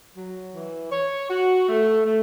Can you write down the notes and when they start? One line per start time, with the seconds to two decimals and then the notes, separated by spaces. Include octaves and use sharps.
0.16 F#3
0.54 E3
0.92 C#5
1.30 F#4
1.69 A3
2.06 A3